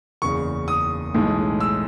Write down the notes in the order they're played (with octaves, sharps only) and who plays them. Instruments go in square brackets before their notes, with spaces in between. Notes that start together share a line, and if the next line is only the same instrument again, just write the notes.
[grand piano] F#1 E2 C#3 C#6
D#6
B1 A2 E3 G#3
E6